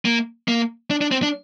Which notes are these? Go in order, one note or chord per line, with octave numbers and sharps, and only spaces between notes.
A#3
A#3
D4
D4
C4
D4